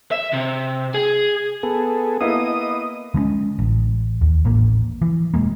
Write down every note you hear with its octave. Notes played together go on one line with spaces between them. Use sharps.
E5
C3
G#4
B3 G#4 A4
A#3 B3 E4 D#5 D#6
D3 G#3 B3 C#4
A1
D#2
A1 A2 A#3
E3
E1 G#2 G#3 A#3